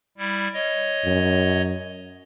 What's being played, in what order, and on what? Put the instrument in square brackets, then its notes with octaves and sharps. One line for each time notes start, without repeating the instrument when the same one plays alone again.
[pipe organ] G3 E4
C#5 D#5
[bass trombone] F#2